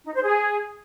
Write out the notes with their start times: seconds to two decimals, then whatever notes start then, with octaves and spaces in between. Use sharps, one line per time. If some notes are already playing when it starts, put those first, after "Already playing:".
0.05 D#4
0.14 C5
0.23 G#4